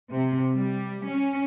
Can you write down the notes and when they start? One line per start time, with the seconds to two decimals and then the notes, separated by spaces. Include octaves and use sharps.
0.11 C3
0.56 G3
1.08 C#4